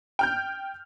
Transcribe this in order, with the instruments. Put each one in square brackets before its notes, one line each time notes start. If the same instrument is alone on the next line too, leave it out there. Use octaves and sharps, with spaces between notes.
[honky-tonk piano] G5 F6 G6